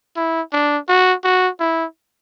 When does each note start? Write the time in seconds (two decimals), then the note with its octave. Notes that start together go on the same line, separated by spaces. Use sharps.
0.16 E4
0.53 D4
0.89 F#4
1.24 F#4
1.60 E4